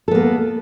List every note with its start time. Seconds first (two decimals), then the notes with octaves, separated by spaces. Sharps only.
0.08 A4
0.11 B3
0.15 A#3